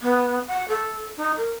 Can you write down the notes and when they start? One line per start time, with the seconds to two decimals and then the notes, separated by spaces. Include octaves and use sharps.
0.02 B3
0.48 F#5
0.69 A4
1.17 D#4
1.37 A#4